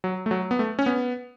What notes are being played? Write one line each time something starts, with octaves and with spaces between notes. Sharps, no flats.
F#3
A3
F#3
B3
A3
C#4
B3